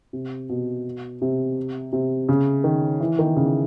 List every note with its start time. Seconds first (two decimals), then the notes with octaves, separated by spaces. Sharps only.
0.13 C3
0.49 B2
1.22 C3
1.93 C3
2.29 C#3
2.64 D#3
3.00 E3
3.19 D#3
3.36 C#3